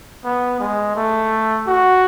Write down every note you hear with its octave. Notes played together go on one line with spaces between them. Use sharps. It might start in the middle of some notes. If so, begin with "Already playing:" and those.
B3
G#3
A3
F#4